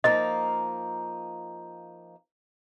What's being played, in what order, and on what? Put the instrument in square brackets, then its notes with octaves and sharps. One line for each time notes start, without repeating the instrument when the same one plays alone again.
[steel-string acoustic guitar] F3 A#3 D#4 [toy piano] D#5